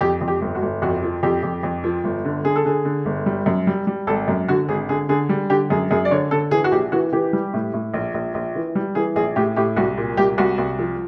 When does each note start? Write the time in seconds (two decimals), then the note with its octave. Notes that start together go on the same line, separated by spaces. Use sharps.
0.01 F2 G4
0.21 F2
0.28 G4
0.41 G1
0.55 F#4
0.62 G1
0.82 F2 F#4
1.03 F3
1.23 F2 G4
1.43 F2
1.63 F2
1.84 F3
2.04 G1
2.25 D3
2.45 D3 G#4
2.56 A4
2.65 D3 G#4
2.85 D3
3.05 G1
3.26 G3
3.46 F#2
3.67 G3
3.87 G3
4.07 G#1 A4
4.28 F#2
4.48 D3 F#4
4.69 G#1 G#4
4.89 D3 G#4
5.09 D3 G#4
5.29 G3
5.50 D3 G4
5.70 F#2 G#4
5.91 F#2 G#4
6.05 D5
6.11 D3 C#5
6.31 D3 A4
6.51 E3 G#4
6.64 F#4
6.72 A#1 G4
6.92 E3 F#4
7.13 E3 G4
7.33 G3
7.54 A2
7.73 A2
7.94 A#1
8.14 A#1
8.34 A#1
8.55 E3
8.75 G3
8.95 E3 G#4
9.16 A#1 G#4
9.36 A2 G4
9.56 A2 G4
9.76 C2 F#4
9.97 A#2
10.17 C2 G4
10.38 C2 F#4
10.58 C2
10.79 F3